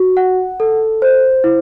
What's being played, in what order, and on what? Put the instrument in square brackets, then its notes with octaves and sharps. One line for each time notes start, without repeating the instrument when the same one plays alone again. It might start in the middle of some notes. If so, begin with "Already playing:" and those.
Already playing: [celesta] F#4
F#5
A4
C5
E4